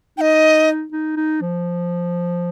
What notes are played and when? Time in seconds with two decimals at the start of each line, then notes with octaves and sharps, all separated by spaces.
0.18 D#4 D#5 G5
0.92 D#4
1.16 D#4
1.41 F3